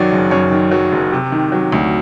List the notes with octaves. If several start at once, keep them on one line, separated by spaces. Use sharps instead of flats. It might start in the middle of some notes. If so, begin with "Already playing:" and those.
Already playing: F#2 D#3 F#3 C#5 D5
F#1
F#2 C#5
D#3
F#3
F#1
C3
D#3
F#3
D2